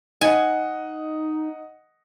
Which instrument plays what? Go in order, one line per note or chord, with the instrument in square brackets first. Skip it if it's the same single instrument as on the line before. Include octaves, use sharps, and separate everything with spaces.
[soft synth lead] D#4 [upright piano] D#5 F#5 [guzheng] G#5